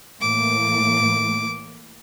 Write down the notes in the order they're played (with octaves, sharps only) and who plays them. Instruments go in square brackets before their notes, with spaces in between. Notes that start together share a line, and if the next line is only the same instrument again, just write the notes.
[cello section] A2 E3 A#3 [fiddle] D6